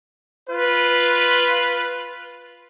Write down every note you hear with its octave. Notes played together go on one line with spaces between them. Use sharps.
F4 B4